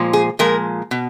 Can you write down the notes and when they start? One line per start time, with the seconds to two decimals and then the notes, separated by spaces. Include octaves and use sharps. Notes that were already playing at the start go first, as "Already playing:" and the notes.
Already playing: A#2 F3 G#3
0.13 G#4
0.39 A#2 F3 G#3 A#4
0.91 B2